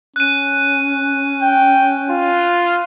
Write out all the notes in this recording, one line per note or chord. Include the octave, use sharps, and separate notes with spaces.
C#4 F#6 D#7
G5
F4